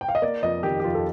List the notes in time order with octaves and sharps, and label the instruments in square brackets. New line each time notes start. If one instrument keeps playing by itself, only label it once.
[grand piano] G5
F5
D#5
A#3 D5
F2 D#5
D#3 G4
G4
F2 F4
A4